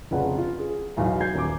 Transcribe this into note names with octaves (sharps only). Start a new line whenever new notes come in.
F1 C#3 D4 F4 B4 F#5
F4
G#4
B1 E2 F5
G6 G#6 C7
D#1 D6